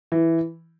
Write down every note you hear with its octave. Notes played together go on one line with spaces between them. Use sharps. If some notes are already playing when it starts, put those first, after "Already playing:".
E3